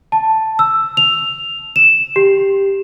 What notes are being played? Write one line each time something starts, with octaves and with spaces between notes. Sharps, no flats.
A5
E6
F7
E7
G4